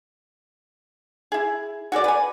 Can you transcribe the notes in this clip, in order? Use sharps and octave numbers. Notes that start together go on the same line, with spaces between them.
E4 G#4
F#4 G#4 C5 D5
B4 G#5